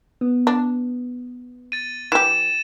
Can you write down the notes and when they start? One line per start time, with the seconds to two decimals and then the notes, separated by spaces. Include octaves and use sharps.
0.21 B3
0.47 D4
1.72 A6 D#7
2.12 E3 G4 E7